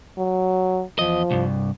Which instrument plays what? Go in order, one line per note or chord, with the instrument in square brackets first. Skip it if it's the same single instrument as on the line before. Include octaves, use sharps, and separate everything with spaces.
[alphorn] F#3
[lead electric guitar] E2 D#5 [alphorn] F3
[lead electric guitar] C2 G2